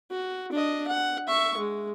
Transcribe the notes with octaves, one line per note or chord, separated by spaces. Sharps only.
F#4
D4 D#5
F#5
E5 C#6
G#3